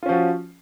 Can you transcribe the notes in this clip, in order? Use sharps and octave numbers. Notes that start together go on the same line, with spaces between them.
F3 C#4 F4 F#4